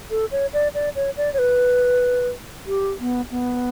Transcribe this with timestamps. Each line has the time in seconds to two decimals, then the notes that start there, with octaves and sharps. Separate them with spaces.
0.11 A4
0.32 C#5
0.53 D5
0.75 D5
0.96 C#5
1.17 D5
1.34 C#5
1.39 B4
2.67 G4
2.99 B3
3.31 B3